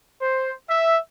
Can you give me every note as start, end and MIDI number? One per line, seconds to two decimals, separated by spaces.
0.22 0.52 72
0.70 0.99 76